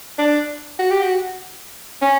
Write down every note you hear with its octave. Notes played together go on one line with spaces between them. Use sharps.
D4
F#4
G4
F#4
C#4